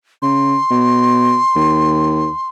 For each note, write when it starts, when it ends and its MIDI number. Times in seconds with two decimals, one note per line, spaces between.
0.22 0.57 49
0.22 2.49 84
0.70 1.37 47
1.56 2.29 39